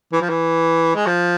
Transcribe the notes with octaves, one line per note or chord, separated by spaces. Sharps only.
E3
F3
E3
G#3
F3